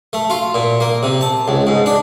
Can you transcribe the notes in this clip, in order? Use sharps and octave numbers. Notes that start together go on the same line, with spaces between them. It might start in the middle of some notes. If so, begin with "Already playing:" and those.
A3
F4
A#2
A#3
C3
A5
C#2
G#2
D4